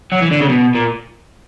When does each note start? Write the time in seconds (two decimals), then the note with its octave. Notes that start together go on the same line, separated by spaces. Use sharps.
0.12 F#3
0.22 E3
0.31 D3
0.41 C#3
0.49 B2
0.75 A#2